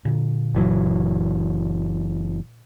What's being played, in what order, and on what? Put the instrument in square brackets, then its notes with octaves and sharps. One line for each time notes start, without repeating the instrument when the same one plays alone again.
[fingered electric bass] A#2 D3
[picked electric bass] F#1 E3 F#3